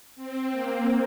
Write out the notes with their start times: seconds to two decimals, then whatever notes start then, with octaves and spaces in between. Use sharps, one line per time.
0.16 C4
0.51 A#3